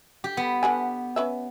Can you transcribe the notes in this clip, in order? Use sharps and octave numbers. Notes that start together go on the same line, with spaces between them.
G4
B3
D3 B4 G#5
C#4 B4 E5